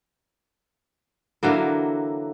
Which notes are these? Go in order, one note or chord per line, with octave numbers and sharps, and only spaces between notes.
D3 E3 F#3 A#3